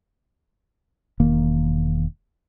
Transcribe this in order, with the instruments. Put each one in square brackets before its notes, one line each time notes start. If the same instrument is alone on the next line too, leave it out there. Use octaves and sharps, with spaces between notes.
[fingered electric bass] E1 D#3 A#3